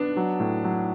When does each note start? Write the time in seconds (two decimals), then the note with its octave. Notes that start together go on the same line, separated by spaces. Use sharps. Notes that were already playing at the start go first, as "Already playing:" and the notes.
Already playing: B3 D4
0.17 F#3
0.40 A2
0.64 F#3